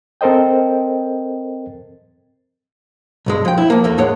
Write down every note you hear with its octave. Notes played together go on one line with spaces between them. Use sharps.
C4 A4 A#4 C5 D#5 G5
B1 G2 G#3
F3 G5
E4
F3 A#3
E2 A3 A#3
A2 G#3 C#5 F#5